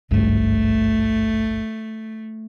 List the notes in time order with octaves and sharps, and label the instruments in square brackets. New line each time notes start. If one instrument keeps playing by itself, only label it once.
[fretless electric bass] G#1 C#2 G2 [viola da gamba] A3